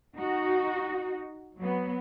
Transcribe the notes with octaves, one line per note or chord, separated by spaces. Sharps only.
D#4 F#4
F#3 B3